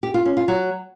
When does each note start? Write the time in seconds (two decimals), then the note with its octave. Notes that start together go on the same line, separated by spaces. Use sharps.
0.03 G4
0.14 F4
0.25 C#4
0.37 F4
0.48 F#3